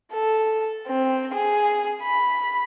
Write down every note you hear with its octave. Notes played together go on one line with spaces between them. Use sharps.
A4
C4
G#4
B5